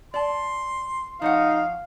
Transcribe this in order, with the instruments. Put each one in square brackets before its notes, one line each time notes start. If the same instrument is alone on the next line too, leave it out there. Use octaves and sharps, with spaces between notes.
[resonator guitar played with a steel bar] D5 A5 [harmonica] C6
[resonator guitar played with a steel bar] F3 C#5 F#5 [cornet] D#4 [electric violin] F5